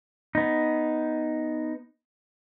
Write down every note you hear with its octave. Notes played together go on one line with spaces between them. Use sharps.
B3 D#4